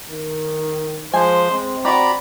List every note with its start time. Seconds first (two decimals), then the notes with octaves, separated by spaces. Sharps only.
0.10 D#3
1.14 F3 G#3 C5 G#5
1.52 G#3 C4
1.85 F#4 G4 D5 A#5 B5